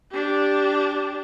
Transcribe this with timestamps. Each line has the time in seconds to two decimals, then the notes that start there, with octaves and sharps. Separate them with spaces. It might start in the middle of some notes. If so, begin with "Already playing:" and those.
0.11 D4 G4